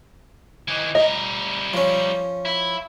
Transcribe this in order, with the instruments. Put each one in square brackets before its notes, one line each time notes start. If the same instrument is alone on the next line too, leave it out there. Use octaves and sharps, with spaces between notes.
[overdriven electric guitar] D#3 E3
[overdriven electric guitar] G3 A#4 [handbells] D#5
[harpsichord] F3 C#4
[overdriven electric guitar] E4